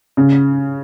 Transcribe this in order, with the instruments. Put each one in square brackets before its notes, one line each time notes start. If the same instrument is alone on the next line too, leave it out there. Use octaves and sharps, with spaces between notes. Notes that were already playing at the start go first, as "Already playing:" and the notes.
[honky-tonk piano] C#3